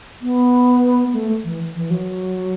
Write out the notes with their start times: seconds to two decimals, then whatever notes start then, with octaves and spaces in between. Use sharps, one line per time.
0.22 B3
1.13 A3
1.44 E3
1.75 E3
1.90 F#3